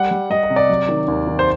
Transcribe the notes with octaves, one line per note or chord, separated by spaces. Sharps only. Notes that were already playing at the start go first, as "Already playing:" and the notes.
Already playing: G3 F#5
G3
G3 D#5
D#5
C3
D5
F#3
D#3
D#2
D#3
C5